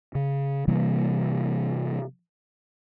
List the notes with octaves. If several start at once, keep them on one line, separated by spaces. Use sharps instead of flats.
C#3
C3 E3 G3 A#3